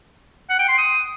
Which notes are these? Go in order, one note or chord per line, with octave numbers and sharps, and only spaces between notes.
F#5
G5
C6
D#6